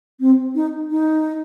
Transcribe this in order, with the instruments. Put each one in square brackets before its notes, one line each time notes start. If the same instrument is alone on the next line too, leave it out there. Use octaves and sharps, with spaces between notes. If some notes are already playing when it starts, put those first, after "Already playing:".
[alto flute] C4
D#4
D#4